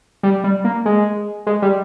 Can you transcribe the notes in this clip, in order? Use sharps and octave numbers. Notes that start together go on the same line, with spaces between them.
G3
G3
A#3
G#3
G#3
G3